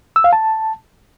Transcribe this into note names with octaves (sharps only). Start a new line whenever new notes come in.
E6
F5
A5